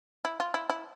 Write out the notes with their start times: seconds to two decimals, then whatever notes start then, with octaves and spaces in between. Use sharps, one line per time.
0.25 E4
0.40 F4
0.54 E4
0.70 E4